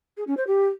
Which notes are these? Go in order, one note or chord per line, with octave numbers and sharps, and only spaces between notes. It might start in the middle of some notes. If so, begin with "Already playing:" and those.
G#4
C#4
C5
G4